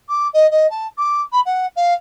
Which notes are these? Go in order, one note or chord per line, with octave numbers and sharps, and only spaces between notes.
D6
D#5
D#5
A5
D6
B5
F#5
F5